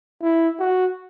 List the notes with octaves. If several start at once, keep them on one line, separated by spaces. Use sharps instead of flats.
E4
F#4